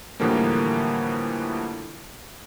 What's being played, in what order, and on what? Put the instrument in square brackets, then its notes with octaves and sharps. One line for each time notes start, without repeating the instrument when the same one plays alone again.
[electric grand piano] A2 D3 E3 F3 G3 A#3